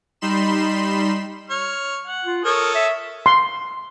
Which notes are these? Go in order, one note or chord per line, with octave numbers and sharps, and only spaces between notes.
G3 D#4 B5 C6 E7
C#5 F6
F#5
F4
A4 A#4 C#5 D#6
E5
C6